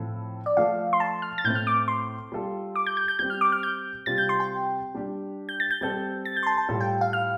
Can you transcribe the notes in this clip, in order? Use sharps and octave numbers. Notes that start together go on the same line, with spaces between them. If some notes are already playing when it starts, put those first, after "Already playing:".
Already playing: A2 F3 C4 A4
D5
F3 A3 F4 A4 F5
C6
A5
F6
A6
A2 A3 C4 G6
F6
D6
C6
G3 F4 A4
D6
G6
G6
G6
G3 C4 G4 G6
F6
D6
F6
G6
C3 G3 C4 F4 A6
G6
C6
G5
G3 D4 G4
G6
A6
G6
G3 C4 A4 G6
A6
G6
C6
A5
A5
A2 G3 F4 A4
G5
F5
F6